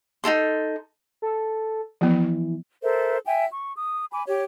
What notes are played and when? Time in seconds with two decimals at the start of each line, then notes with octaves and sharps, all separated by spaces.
0.24 D#4 F4 A4 C6
1.22 A4
2.01 E3 F3 B3
2.82 A4 A#4 C5 E5
3.26 E5 G5 G#5
3.50 C#6
3.75 D#6
4.11 G#5 B5 D6
4.27 G4 C#5